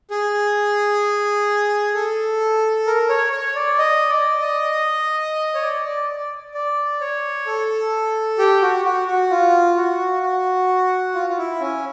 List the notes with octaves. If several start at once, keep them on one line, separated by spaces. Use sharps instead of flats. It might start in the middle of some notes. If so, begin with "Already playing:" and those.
G#4
A4
A#4
C#5
C#5
D5
D#5
D5
D#5
C#5
D5
D5
D5
D5
C#5
A4
G4
F#4
F#4
F#4
F4
F#4
F#4
F4
F4
E4
C#4